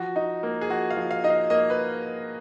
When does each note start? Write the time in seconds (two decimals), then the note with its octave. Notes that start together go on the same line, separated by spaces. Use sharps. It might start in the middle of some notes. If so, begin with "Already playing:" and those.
Already playing: F3 F#4
0.16 D#4
0.43 A#3
0.61 G#4
0.69 F3 F#4
0.90 F5
0.96 F3
1.11 F5
1.24 D#4 D#5
1.30 F5
1.50 A#3 D#5
1.70 B4